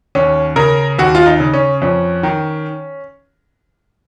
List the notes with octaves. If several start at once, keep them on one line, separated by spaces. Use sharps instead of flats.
D#2 C#4
C#3 A#4
D#2 F#4
F4
D#4
C#3
C#4
F2 C#4
D#3